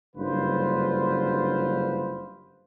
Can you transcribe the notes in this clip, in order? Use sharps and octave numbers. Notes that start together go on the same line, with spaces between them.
F#1 G2 D3 F4 B4 C5